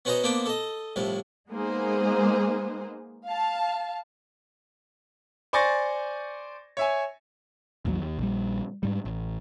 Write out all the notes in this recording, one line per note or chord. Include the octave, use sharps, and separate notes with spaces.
B3 C#4 F#4 C5 D#5 A#5
A#3 B3 D4 C5 G5
A4 D#5
C2 A2 F3
G#3 A#3 B3 D#4 G#4 C5
F5 A5
C5 D5 G#5 C#6 A6 A#6
C#5 E5 G#5
A1 D#2 F3 F#3
D#2
A#1 G3
G#2 G3
A1